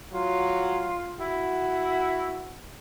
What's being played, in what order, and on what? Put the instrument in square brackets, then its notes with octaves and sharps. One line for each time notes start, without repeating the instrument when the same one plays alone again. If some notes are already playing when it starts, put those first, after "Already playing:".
[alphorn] F#3 [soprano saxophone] F4
[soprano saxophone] E4 [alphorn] F#4